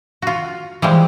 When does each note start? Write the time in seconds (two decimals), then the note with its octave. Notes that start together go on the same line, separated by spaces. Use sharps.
0.22 F4 F#4
0.82 E3 F3 G3 G#3